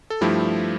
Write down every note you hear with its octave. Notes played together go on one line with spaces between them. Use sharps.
A4
G2 F3 A3 E4 G4